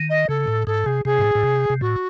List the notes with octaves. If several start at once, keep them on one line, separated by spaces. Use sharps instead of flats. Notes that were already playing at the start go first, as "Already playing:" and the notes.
Already playing: D#3
D#5
C#3 A4
A2
G#2 A4
C3 G#4
C3 G#4
G#2
A2
A2
C3
C3
A2 F#4